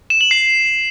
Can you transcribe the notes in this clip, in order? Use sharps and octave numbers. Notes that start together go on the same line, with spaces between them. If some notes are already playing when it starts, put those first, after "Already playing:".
E7
F#7
C7